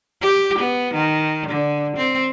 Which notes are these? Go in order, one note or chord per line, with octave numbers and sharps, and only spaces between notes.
G4
B3
D#3
D3
C4